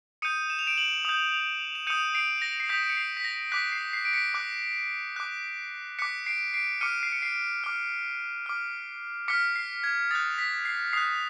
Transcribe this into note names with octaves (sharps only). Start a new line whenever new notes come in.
D#6 G6 C#7 D#7
E7
F7
D7 E7
E7 F#7
D#6 G6
E7
D#6 G6 C#7 D#7
C7 D7
A#6
C7
D#6 G6 B6
D7
C#7
C7
B6
A#6
D6 F#6 B6
C7
C7
D7
B6 C#7
D6 F#6
D6 F#6
D6 F#6 B6 C#7
C7 D7
C7 D7
D6 F6 C#7 D#7
C7
C#7
C7 D7
D6 F6
D6 F6
D6 F6 B6 C#7
C7
G#6
D#6 F#6 A6
B6
C7
D#6 F#6 C7